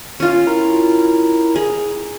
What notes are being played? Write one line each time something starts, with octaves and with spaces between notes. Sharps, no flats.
C#4 F4
E4 A#4 A#5
G#4